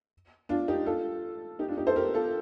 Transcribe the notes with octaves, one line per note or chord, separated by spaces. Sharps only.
D4 F4
D#4 G4
F4 A4
D#4 G4
D4 F4
D#4 G4
A4 C5
G4 A#4
F4 A4